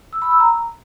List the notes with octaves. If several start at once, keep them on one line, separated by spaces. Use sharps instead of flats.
E6
B5
E6
A#5